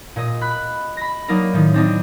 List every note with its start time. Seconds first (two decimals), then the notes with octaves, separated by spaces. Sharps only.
0.16 A#2 D#5
0.41 B5 F#6
0.97 B5 A#6
1.28 F#3 A#3 D4 D#4 A#4
1.53 A2 D#3
1.74 C4 D4 D#4